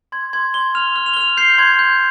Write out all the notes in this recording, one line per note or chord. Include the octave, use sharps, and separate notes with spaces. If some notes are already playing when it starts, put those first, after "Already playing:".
C6 G#6
C6 G#6
C6 G7
F6 F7
F6
F7
G7
F6 F7
G6 C7
G6
C6 G#6
G6